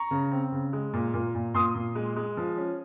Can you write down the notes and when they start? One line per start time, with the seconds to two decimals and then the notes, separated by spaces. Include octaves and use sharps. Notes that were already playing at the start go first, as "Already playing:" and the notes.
Already playing: A#5 C#6
0.11 C#3
0.31 C4
0.52 C#3
0.73 G#3
0.94 A#2
1.14 A#2
1.35 A#2
1.54 A#2 C6 D#6
1.75 A#2
1.95 G#3
2.16 G#3
2.37 F3
2.57 C#4